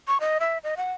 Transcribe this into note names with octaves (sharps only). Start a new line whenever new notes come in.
C#6
D#5
E5
D#5
F#5